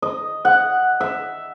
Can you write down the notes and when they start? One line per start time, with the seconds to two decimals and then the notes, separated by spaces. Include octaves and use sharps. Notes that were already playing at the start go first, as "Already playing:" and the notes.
0.02 D#5
0.45 F#5
1.00 E5